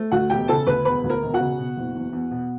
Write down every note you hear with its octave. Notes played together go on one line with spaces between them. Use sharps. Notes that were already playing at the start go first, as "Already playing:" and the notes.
Already playing: A3
D2 F#4 F#5
E1 G4 G5
C#3 A4 A5
D2 B4 B5
E1 B4 B5
D2
A#4 A#5
E1
F#4 F#5
C#3
B2
F#1
E2
E2
B2